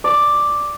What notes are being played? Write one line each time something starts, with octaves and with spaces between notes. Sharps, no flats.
D5